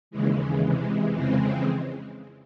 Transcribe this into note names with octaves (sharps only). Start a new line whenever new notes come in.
D#2 C#3 E3 G#3
C3 E3 G#3
F2 C#3 E3 G#3 C4